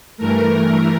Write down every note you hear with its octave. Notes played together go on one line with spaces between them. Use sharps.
G2 E3 A3 A#4